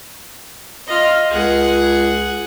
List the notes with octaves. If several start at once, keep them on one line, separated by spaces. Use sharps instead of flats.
F4 D#5
C#2 G#4 F#5